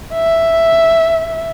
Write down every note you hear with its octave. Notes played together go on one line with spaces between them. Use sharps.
E5